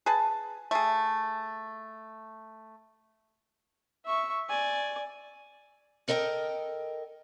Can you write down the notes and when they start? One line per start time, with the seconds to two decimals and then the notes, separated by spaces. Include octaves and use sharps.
0.06 G#4 B4 A5
0.71 A3 G#4
4.05 E5 C#6
4.49 D5 G#5
6.08 A4 A#4 D#5 F5 G5